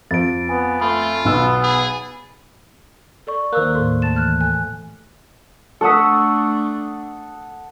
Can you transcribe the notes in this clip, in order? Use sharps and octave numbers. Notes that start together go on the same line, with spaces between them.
F2 A6 D7
B3 G#5
A3 F4 B5
B1 F#3 B3 E6
G#4
A4 D5 C#6
D#2 A#3 C5 E6 F#6
A2 A4 C6
A3 A5 A6 E7
E3 F6 F#6
A4 G#5 F#6
A3 D4 A4 F#5 C#6 D#6 E6 B6